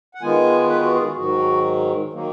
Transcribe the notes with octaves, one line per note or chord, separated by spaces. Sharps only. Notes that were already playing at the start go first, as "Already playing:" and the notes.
F#5
D#3 G#3 B3 F4 G#5
B4
F#4
G#4
F#4
G#2 D#3 F#3 F#4
D#3 F#3 A#3